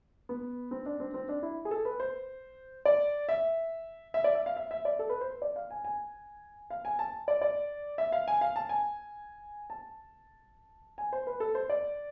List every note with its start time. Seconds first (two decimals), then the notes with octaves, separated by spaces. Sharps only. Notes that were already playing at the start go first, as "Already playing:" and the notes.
0.29 B3
0.71 C4
0.86 D4
1.00 C4
1.14 C4
1.29 D4
1.43 E4
1.65 G#4
1.71 A4
1.85 B4
2.00 C5
2.85 D5
3.29 E5
4.14 E5
4.24 D5
4.35 E5
4.46 F5
4.56 E5
4.71 E5
4.85 D5
4.99 A4
5.10 B4
5.21 C5
5.42 D5
5.56 F5
5.71 G#5
5.85 G#5
6.70 F5
6.85 G#5
6.99 A5
7.28 D5
7.42 D5
7.98 E5
8.12 F5
8.28 G#5
8.41 F5
8.56 A5
8.69 G#5
9.70 A5
10.98 G#5
11.13 C5
11.27 B4
11.40 A4
11.55 C5
11.70 D5